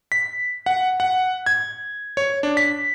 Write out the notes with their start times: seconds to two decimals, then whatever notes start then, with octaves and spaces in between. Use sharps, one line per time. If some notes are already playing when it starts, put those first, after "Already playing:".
0.12 B6
0.66 F#5
1.00 F#5
1.46 G#6
2.17 C#5
2.43 D4
2.57 B6